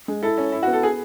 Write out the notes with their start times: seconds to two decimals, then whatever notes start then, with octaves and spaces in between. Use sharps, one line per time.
0.08 G#3
0.22 E4 A4
0.38 C#4
0.52 E4
0.63 F#4
0.67 B3
0.73 A4
0.83 G#4